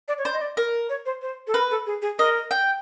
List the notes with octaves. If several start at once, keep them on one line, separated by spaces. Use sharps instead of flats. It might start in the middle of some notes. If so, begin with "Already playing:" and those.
D5
C#5
C5 D5
D#5
D5
A#4
C#5
C5
C5
A4
A#4 B4
A4
G#4
G#4
A#4 D#5
G5